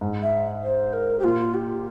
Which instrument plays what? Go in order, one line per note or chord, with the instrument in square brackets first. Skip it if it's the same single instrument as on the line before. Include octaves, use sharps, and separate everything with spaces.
[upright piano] G#2
[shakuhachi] E5
C5
A#4
G4
[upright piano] A#2 [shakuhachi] F4
[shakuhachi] G4